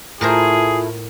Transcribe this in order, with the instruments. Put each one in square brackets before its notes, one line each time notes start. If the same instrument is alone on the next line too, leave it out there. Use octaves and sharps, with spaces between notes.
[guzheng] A2 A#4 C5 [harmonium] A3 E4 [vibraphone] F4 A5 [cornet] G#4